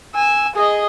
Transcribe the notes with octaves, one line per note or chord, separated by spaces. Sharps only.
G#5 E6
G#4 D#5